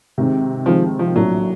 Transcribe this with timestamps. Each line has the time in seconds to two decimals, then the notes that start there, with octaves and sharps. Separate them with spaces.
0.18 C3 D#3 G#3 C4
0.66 C3 D#3 F3 G#3 C4
0.99 F3
1.16 A#1 A2 F3 F#3 A#3 D4